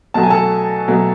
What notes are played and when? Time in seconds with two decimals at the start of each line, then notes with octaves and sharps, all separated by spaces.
0.14 B2 F#3 A3 A5
0.23 G#5
0.30 A4 A5
0.88 B2 F#3 A3